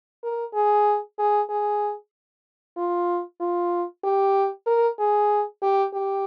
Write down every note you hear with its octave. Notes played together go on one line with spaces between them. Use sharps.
A#4
G#4
G#4
G#4
F4
F4
G4
A#4
G#4
G4
G4